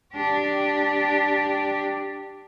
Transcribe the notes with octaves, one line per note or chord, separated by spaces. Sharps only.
D4 G4